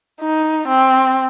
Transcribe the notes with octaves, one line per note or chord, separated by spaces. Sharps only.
D#4
C4